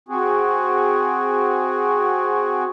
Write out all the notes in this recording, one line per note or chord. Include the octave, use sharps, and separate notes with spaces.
C4 F#4 G#4